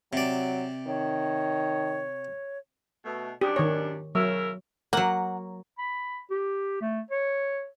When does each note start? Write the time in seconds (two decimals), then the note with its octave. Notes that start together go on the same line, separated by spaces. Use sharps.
0.13 C3 F#3 D5
0.87 D#3 C#5
3.05 B2 A3
3.41 F#2 G3 D4 G4
3.56 D#3 C#5
4.15 C#3 F#3 A#4 E5
4.93 F#3 A#3 F#5
5.78 B5
6.30 G4
6.82 A3
7.11 C#5